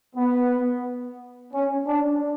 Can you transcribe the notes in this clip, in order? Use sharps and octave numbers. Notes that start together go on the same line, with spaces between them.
B3
C#4
D4